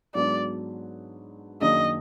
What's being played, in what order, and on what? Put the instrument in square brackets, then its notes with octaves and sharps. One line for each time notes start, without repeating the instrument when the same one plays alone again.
[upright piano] G#2 F#3 B3 D4 F#4 [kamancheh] D5
[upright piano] F#2 D#3 A#3 D4 G#4 [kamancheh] D#5